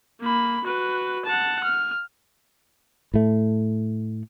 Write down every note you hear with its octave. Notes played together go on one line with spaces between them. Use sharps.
A#3 B5
F#4 B4
F#5 A5
F6
A2 A3